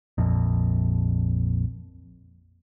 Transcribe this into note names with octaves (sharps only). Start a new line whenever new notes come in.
A#1 F2